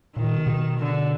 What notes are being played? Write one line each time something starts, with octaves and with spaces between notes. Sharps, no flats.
A#2 D#3
C3
B2
D3